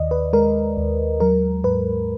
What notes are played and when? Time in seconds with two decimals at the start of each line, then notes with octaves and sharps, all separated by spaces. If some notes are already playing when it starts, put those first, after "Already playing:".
Already playing: D#2 D#3 D5 D#5
0.11 B4
0.33 G#3 A#4
0.77 D#2
1.20 F#3 A#4
1.64 G#2 B4